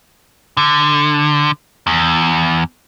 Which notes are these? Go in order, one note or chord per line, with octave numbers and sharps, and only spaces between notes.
D3
E2